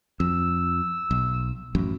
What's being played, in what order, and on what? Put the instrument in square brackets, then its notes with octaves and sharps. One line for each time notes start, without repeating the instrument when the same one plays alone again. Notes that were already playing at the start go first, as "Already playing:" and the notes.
[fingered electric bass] F2 [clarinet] E6
[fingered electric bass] B1
A1 F#2